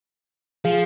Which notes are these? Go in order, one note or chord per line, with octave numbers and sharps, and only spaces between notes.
F3 G#4 F5